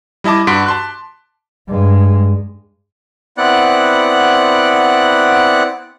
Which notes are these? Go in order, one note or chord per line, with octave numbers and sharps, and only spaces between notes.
G3 E4 D#5 A5 D6
G2 F#4 C6 B6 D7
A5 C6 F#6
G2 G#3
B3 C4 E4 D5 F#5 F#6